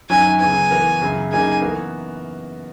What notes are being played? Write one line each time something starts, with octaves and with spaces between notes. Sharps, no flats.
F#2 D#3 F#3 C#4 G#5
C#3 F#3 B3 G#5
E3 B3 F#4 A#4
F#2 C#3 F#3
C#3 F#3 A#3 D#4 G#4 G#5
E3 B3 F#4 A#4